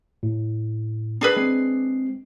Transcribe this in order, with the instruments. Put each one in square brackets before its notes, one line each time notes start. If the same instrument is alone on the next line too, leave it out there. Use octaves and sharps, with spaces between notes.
[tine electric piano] A2
[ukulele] D4 G#4 B4
[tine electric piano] G#3 C4 C7